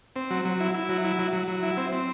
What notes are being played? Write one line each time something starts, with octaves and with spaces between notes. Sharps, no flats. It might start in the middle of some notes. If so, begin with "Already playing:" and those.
C4
F#3
F#3
E4
E4
F#3
E4
F#3
F#3
F#3
E4
C4
C4